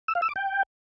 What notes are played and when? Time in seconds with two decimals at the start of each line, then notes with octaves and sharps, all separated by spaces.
0.08 E6
0.15 F5
0.22 E6
0.29 D6
0.36 G5